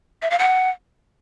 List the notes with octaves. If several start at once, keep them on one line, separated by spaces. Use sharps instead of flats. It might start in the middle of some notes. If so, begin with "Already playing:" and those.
E5
F5
F#5